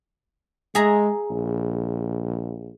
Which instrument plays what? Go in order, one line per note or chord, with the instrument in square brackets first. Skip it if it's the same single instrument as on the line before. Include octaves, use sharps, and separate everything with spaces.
[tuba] G#3 [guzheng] G#4 E5 A#5
[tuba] A#1